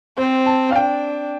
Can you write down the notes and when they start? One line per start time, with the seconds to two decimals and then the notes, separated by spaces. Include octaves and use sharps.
0.18 C4 C5
0.46 A5
0.71 F5
0.75 D4 G5